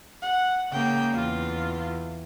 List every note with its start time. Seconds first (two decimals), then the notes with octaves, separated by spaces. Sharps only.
0.23 F#5
0.72 C#3 A#3 G5
1.14 E2 F4